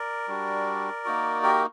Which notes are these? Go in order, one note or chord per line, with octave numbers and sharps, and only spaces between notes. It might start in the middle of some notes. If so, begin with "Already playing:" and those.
Already playing: A#4 D5
G3 D4 F#4
A#3 D#4 F#4
G4 A#4